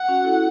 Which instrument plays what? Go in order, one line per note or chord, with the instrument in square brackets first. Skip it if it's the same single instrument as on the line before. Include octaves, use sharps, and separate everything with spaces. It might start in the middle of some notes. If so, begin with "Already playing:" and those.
Already playing: [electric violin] F#5
[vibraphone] C#4 F#4
E4 A4